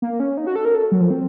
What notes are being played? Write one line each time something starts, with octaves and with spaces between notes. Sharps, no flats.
A#3
C#4
D#4
F#4
A4
A#4
A4
F#3
F3
C4